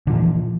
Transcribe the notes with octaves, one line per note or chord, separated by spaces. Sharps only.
A#2 D3 E3 F3